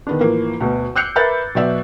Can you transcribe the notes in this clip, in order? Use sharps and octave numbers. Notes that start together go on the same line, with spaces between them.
D#3 B3 D4
A2 E3 F3 A#3
D2 B2
D6 E6 F#6 G6 C7 C#7
A#4 B4 E5 G6 A6
B2 F#3 D5 E5 E6